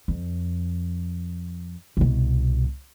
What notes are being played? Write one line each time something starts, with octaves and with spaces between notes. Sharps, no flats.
F2
C2 B2